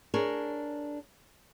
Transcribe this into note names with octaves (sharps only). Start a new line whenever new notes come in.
D4 G#4 A#4 C#5